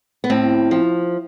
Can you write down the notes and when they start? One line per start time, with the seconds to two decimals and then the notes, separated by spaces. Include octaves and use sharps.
0.24 B3
0.30 A2 C4
0.71 F3